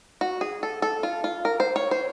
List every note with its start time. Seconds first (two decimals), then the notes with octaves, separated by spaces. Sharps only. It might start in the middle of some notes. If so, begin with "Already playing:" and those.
0.21 F#4
0.41 G#4
0.63 A4
0.82 A4
1.03 F4
1.24 F4
1.45 A#4
1.60 C5
1.76 C#5
1.91 C5